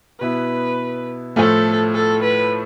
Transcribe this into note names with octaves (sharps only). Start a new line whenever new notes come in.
B2 B3 E4 B4
A2 F3 A3 A4
A4
B4